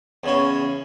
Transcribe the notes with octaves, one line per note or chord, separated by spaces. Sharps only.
E2 C#3 C#5